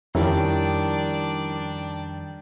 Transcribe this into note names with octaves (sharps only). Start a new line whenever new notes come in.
F2 D#3 G3 C#4 D4 E4 A#4 D5